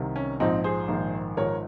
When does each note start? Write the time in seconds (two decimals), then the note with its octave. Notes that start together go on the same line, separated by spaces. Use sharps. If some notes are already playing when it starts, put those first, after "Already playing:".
Already playing: C2 C3 D#3
0.16 C#4
0.40 A#1 G#2 F3 C4 D#4
0.64 G#4 C5
0.88 A#1 G#2 D#3
1.37 G#1 G#2 F3 A#4 C#5